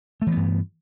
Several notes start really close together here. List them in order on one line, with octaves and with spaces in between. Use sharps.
A3 E3 B3 G2